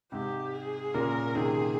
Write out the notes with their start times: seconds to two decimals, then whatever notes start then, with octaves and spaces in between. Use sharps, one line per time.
0.12 G#2 C3 G4
0.54 G#4
0.94 A#2 C#3 A#4
1.35 C3 D#3 G#4